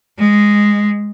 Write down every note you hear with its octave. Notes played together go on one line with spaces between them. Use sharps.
G#3